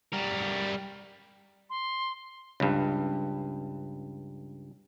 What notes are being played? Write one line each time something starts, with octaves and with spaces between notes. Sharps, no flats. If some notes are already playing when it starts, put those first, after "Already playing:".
G3 A#4
C6
C#2 G2